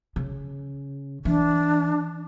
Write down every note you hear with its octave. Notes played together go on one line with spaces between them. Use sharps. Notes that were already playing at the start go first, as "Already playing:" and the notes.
C#3
E3 D4